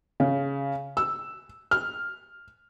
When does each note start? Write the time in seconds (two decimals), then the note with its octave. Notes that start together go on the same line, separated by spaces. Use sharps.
0.20 C#3
0.97 E6
1.71 F6